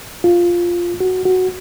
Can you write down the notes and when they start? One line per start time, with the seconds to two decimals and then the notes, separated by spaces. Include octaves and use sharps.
0.24 F4
1.00 F#4
1.25 F#4